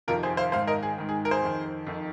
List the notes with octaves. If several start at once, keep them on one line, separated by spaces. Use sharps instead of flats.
F2 C3 D#3 F4 A#4
G#4 C5
C5 F5
G#2 C5 F5
D#3
A#4 D#5
G#4
G#2 D#3
G#4
A#4
G#4 C5
F2 D#3
F2 D#3